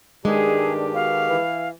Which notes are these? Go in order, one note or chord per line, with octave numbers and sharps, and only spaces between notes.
G2 D#3 G#3 D4 G4 G#4
B2 F5
E3